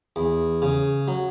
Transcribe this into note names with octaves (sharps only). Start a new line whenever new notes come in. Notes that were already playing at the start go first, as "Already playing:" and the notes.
E2
C#3
F#3